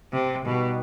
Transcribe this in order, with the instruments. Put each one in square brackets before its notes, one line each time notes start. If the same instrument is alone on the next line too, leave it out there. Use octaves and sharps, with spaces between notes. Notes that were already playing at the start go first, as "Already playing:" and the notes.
[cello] C3
[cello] B2 [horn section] G3 B3 D#4 G4 B4